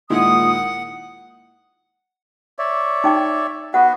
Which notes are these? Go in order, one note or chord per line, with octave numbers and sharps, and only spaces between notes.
A#2 D#3 G#3 E4 F#5 D#6
C#5 D5 E5
D#4 G5 D6
B3 F#4 B4 F#5